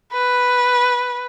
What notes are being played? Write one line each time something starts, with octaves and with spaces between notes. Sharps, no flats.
B4